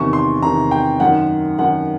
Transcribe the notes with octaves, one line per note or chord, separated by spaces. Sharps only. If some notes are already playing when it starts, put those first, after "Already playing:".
Already playing: E2 C3 D#3 C#6
C6
E2 C3 D#3 A#5
G5
F#2 D#3 F#5
F#2 D#3 F#5